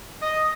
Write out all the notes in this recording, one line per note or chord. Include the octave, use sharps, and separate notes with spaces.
D#5